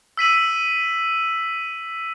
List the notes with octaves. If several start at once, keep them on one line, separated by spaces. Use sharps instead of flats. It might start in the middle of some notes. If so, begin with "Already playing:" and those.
E6 B6 D#7 F#7